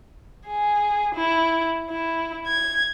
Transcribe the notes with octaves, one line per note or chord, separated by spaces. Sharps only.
G#4
E4
E4
G#6